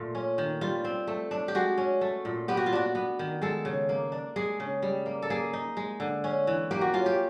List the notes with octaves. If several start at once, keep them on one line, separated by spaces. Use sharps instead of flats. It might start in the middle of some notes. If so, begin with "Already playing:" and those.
Already playing: A#2 A3 F4
C#4
D#3
G3 F4
C4
A3
D4
G4
G#3 F#4
C#4
A3
A#2
B3 G4
F#4
F4
D4 F#4
B3
D#3
G#3 A4
C#3
A#3
D4
G#3 G#4
C#3
G3
A#3
A4
A#3 G#4
D#4
G#3
D3
C#4
E3
A#3 G4
F#4
C#4 F4
G4